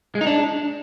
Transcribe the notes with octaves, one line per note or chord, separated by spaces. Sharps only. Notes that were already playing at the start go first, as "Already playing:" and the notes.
G#3
D#4
D4